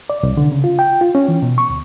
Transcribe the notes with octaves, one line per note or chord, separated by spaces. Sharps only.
D5
C2
D3
C#3
F4
G5
F4
C#4
E3
B2
C#6
D2